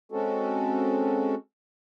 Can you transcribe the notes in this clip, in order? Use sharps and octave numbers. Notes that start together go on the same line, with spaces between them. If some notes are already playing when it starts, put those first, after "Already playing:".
G#3 C4 C#4 F#4 A4